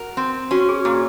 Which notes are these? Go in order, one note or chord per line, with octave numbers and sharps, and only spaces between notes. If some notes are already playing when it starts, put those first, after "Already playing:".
Already playing: F#4 A#4
C4
C#4 F#4
G#4
A#2 G#4